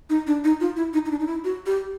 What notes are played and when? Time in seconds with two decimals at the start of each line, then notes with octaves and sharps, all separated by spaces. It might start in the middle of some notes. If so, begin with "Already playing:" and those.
0.10 D#4
0.27 D4
0.44 D#4
0.60 F4
0.76 E4
0.93 D#4
1.06 D#4
1.11 D4
1.19 D#4
1.27 E4
1.44 F#4
1.66 G4